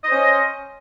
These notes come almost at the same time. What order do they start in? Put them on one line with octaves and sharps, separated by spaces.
D#5 C5 C#4